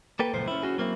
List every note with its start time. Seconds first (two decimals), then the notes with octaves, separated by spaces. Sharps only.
0.19 A#3 A4 B4 G5
0.34 C#2 F#2 A#2 F3 C5
0.48 C#4 E4
0.62 C#4 F#4 G#4
0.78 F#3 A#3 C4 E4